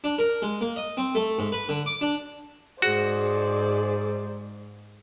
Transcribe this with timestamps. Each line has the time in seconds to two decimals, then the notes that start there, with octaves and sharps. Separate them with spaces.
0.04 D4
0.19 A#4
0.42 G#3
0.61 A#3
0.76 D#5
0.97 C4
1.15 A3
1.39 G#2
1.52 B4
1.69 D3
1.86 D6
2.01 D4
2.82 G#2 F#4 G#4 C5 D5